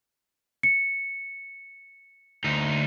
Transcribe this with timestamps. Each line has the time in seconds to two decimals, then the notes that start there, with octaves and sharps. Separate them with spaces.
0.63 C#7
2.44 D2 D#4